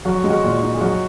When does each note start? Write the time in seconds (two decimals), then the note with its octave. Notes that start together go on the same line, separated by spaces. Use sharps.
0.05 F#2 F#4
0.24 G#3
0.30 F#4
0.44 A#2
0.63 D#4
0.74 G#4
0.81 F#2 F#4